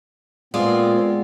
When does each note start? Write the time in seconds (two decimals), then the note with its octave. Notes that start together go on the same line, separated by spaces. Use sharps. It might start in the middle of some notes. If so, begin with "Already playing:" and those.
0.54 A#2 G#3 B3 C4 F4 D5